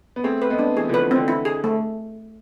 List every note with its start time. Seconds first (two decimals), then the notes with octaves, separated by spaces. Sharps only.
0.16 B3
0.24 A3 C4 G#4
0.42 B4
0.50 G#3 B3
0.59 D4
0.77 E3 G#4
0.89 D3 F3 B4
1.11 D3 C4
1.28 E4
1.45 G#4
1.64 A3